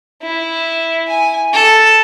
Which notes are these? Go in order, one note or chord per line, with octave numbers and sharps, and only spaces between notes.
E4
G#5
A4